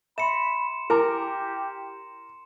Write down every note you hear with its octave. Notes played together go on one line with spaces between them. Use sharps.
E5 B5 C6 C#7 E7
E4 G4 A#4 G#5 D6